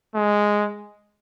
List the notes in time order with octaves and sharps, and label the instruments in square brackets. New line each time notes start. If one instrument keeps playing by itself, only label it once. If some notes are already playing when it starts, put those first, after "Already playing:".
[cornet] G#3